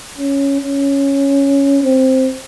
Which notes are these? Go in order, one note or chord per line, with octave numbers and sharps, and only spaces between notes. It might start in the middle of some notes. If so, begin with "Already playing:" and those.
C#4
C#4
C4